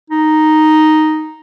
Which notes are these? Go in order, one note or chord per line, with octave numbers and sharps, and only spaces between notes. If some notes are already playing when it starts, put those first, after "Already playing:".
D#4